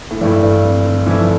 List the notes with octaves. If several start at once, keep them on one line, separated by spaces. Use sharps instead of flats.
A2
G2 E3 A3 E4
G2
F2
D3
E3 F3 A3 E4